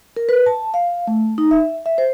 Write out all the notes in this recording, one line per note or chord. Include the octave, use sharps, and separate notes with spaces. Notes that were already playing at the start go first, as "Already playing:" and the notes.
A#4
B4
A5
F5
A3
D#4
E5
E5
C5